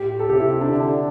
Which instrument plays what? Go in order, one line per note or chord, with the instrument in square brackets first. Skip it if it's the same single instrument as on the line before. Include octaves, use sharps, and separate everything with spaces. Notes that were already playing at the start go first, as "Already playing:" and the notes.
Already playing: [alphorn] A2 [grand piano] G4
[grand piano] A4
[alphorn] C3 [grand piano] G4
[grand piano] E4
E4
D4
[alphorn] D3